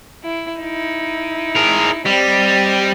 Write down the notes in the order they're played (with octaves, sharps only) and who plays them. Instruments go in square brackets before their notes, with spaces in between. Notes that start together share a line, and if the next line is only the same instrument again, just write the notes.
[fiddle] E4
D#4 E4
[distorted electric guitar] G#4 A#4
[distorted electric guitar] G3 [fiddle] C4 D#5